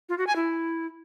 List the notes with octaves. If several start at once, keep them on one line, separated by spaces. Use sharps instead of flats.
F4
F#4
G#5
E4